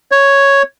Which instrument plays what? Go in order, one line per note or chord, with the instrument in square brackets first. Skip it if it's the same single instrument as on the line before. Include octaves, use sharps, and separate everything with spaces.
[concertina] C#5